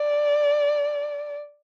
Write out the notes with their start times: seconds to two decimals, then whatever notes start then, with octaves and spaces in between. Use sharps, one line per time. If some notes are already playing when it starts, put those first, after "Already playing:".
Already playing: D5